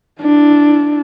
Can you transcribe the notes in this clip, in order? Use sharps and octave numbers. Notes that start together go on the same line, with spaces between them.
D4 E4